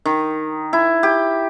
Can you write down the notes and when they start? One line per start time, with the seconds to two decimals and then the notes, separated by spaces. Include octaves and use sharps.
0.05 D#3
0.73 E4
1.03 G4